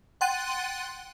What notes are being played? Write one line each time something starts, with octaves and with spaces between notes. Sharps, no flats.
F#5 G5 C6 F#6 A6 D#7